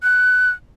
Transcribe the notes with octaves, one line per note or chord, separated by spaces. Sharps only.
F#6